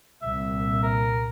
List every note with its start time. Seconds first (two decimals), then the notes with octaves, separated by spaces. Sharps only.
0.22 C2 A#2 E5
0.83 A#4